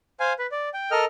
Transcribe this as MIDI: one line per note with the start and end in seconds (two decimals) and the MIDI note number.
0.20 0.33 72
0.20 0.33 77
0.20 0.33 80
0.39 0.47 71
0.52 0.69 74
0.74 0.91 79
0.91 1.05 69
0.91 1.05 70
0.91 1.05 75
0.91 1.05 89